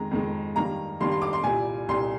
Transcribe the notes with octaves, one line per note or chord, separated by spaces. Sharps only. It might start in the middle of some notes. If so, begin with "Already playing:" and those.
Already playing: F2 D#3 G#3 A#5
F2 D#3 G#3
G2 D#3 G3 A#3 A#5
G2 D#3 G3 A#3 C6
C6
D6
C6
C2 A#2 G3 G#5
C2 A#2 G3 C6